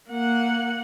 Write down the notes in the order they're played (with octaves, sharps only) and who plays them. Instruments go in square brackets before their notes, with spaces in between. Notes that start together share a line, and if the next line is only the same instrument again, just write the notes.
[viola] A#3 F#5